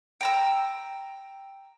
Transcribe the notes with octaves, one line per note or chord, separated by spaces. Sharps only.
G5 A#5 E6